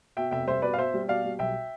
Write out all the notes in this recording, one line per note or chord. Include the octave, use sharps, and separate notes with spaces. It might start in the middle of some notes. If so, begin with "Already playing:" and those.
B2 E5 G5
F1 E5 G5
G3 C5 E5
B2 B4 D5
F5
B2 C5 E5
G3
B2 D5 F5
G3
B1 E5 G5